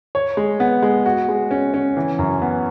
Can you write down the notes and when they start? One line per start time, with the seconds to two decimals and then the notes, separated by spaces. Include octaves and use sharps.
0.15 C#5
0.37 G#3
0.60 B3
0.82 G#3
1.06 F#4
1.29 G#3
1.51 C#4
1.74 C#4
1.97 E3
2.19 F#2
2.42 B3